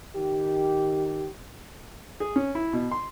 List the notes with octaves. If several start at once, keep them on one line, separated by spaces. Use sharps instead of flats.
D#3 G4
G#4
C#4
E4
B2
C6